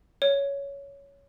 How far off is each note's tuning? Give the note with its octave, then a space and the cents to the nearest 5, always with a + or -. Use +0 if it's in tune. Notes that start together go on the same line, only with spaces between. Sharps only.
C#5 +15